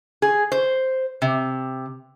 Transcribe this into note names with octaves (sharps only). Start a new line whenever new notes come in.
G#4
C5
C3